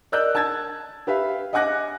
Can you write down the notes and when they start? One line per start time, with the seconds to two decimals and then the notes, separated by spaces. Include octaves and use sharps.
0.12 A#4 D5 D#5 E6 F#6 G6
0.35 A5 E6 G#6 A6
1.07 G4 B4 E5 F5
1.53 D#5 F#5 G#5 D6 F#6 A#6